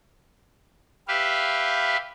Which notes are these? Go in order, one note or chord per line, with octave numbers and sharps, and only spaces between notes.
G4 B4 E5 F5